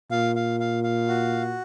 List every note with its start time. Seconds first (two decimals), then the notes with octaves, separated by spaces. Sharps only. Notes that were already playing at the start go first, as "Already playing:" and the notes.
0.11 A#2 F5
0.36 F5
0.60 F5
0.84 F5
1.08 F#4